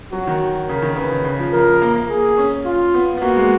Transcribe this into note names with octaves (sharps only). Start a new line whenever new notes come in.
F#3 F#4
D#3
C#3 A#4
D#3
C#3 B4
D#3
C#3
F3
F3 A#4
F3
A#3
A#3
G#4
C#4
F4
B3
B3
A#3 F#4
G#3